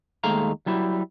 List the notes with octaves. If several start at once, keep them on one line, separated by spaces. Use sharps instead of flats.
D#2 G#3 A3 F5 A#5
F#3 G3 E4